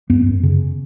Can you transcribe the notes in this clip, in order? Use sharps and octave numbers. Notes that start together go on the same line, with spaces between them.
F#2 B3
F#2
C#3